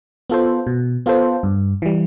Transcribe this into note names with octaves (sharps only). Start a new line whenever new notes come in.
B3 F4 A4 C5
B2
B3 F4 A4 C5
G2
E3 G3